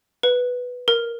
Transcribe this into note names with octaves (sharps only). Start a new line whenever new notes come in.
B4
A#4